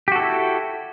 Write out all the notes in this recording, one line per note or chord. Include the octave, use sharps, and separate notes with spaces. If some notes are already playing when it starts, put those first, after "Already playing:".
E4 F#4 G4 A4